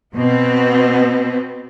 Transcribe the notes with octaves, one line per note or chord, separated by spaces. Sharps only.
B2 B3 C4